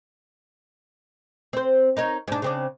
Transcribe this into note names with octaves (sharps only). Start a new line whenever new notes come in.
C4 C5
D#4 A#4 C#5
G#2 D4
C#3 C4 D4